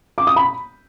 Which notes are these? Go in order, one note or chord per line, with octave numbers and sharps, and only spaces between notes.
D6
D#6
B5